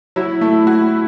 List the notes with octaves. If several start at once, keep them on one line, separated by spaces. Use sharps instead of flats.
F#3 E4
A3
F#4